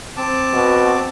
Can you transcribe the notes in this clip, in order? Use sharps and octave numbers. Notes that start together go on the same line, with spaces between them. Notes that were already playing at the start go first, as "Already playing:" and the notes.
C4 A5 D6
B2